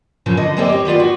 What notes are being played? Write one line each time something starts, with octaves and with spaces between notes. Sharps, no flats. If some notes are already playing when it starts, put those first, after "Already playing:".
A#2 C#3 F3
D3 D#5
D#2 G#3 A#3 C4 D5 D#5
G4 C#5
D#3 B3 F4 D5
F#4